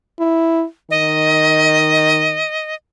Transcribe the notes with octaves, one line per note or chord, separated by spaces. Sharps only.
E4
D#3 D#5